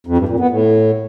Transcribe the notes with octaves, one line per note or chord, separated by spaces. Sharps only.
F2
G2
A#2
B3
A2